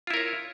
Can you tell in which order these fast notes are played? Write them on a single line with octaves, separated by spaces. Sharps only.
F4 E4 A#4 C#5